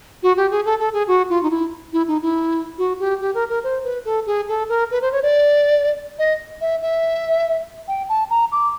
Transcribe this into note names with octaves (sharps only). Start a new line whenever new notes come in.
F#4
G4
G#4
A4
A4
G#4
F#4
F4
D#4
E4
E4
D#4
E4
F#4
G4
G4
A#4
A#4
C5
B4
A4
G#4
A4
A#4
B4
C5
C#5
D5
D#5
E5
E5
G5
A5
A#5
D6